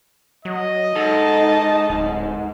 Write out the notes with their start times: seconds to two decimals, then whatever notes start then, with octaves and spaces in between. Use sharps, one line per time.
0.45 F#3 D#5
0.96 G#2 D#4 A4 A5
1.90 D1